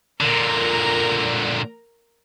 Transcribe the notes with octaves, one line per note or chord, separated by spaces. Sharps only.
A#2 D3 A#4 A#5